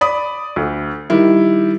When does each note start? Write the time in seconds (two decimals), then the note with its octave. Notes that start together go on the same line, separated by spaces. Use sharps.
0.01 D5 B5 D#6
0.56 D2
1.10 D#3 G3 E4